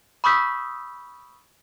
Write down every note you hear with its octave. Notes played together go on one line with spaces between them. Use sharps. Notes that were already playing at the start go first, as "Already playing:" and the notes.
B5 C#6 D#6 E6 G6 B6